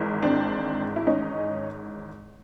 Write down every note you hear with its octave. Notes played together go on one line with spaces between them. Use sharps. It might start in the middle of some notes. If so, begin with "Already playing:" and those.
Already playing: G#1 G#2 E3
C4 D4
E4
C#4 D#4